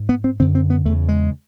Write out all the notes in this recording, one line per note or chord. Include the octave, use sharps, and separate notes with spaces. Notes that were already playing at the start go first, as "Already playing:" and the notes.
Already playing: G#2
B3
C4
F#2 D3 C4
C4
B3
E2 C#3 A3
G#3